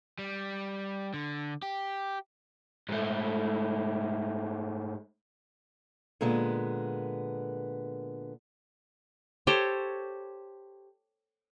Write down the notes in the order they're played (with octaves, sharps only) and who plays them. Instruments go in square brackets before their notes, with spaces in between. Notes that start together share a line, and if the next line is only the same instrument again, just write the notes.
[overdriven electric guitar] G3
D3
G4
G#2 A3
[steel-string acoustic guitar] A#2 D3 G#3 B3
[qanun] G4 A4 C5 C#5